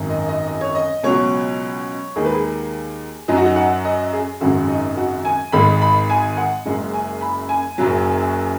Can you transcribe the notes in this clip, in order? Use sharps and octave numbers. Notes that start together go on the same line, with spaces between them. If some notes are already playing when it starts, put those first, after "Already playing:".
Already playing: G#1 F#2 D#3
D#5
D#5
D#5
C#5
D#5
C#2 B2 F#3 C#5
D#2 D#3 G#3 G#4
B4
G#4
F#2 F#3 D#4
F#4
D#4
F#5
D#5
G#4
G#1 F#2 C#3 G#3 F#4
D#4
F#4
G#5
G#1 G#2 G#3 B5
B5
G#5
F#5
F#1 F#2 C#3 G#3
G#5
B5
G#5
F#1 F#2 C#3 F#3